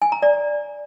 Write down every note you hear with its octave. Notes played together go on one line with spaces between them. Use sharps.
G#5
A#5
D5